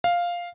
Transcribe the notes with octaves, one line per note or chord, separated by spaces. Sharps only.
F5